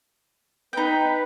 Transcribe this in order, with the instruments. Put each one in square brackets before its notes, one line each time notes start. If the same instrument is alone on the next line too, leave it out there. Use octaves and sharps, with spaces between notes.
[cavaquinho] D#4 G5 [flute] B4